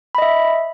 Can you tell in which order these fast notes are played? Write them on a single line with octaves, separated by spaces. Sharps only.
B5 D#5 E5